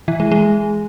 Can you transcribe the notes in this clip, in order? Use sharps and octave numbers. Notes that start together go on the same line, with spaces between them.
E3
G#3
G#3